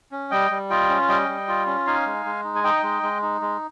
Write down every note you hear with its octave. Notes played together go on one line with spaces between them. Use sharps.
C#4
G3 D#5 G5
G3
F4 D#5 G5
C#4
G3 D#5 G5
G3
F4
C#4
D#4 F5 G#5
G#3
G#3
D#4
G#5
D#4 D#5 G5
G#3
G#3
D#4
G#3